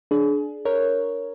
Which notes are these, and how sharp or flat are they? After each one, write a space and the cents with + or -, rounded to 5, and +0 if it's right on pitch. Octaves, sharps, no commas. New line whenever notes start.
D4 +0 G#4 +30
A#4 +0 C#5 +0